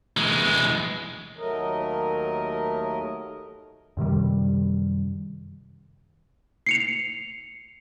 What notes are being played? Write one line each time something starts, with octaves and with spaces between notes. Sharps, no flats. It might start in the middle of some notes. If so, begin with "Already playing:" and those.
E3 G#3
D#2 F#3 A3 A#4 D#5
F#2 C3 D#3 G3
C7 C#7 F7